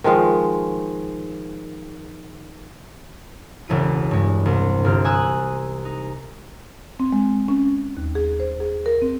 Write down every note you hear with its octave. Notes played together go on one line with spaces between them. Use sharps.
D#3 F3 G#3 F5
E1 C#2 E4 D#7
G2 G#3
C2
G1 G4 F6
G#5 A#5 D#6 E6 F#6
D#4
C4
G#3
C#4
D#2
G#4
C5
G#4
A#4
C4